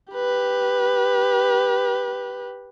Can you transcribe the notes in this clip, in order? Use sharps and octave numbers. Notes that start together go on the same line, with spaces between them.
G4 B4